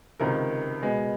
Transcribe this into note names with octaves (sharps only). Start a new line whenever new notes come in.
C#2 C3 D#3 A#4
B2 G#3 B3